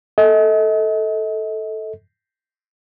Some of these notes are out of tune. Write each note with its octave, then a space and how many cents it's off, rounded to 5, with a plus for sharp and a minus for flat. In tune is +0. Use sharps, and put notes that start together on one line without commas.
A4 +0 D#5 +40